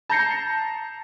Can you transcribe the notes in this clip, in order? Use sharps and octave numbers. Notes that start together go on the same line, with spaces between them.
A5 A#5 G6 A#6 C7 C#7